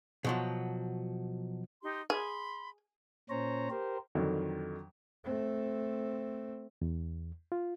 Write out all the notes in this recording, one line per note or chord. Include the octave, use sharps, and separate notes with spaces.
B2 F3 F#3
D#4 G4 C6
G#4 B5 C6
A#2 C#4 C5 C#5 A#5
G4 A#4 C5
F2 D3 D#3 F#3
A3 C4
E2
F4